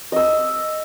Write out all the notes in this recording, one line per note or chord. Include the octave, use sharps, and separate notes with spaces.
D#5 E6